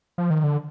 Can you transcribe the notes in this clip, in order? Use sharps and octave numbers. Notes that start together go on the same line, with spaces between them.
F3
D#3
D3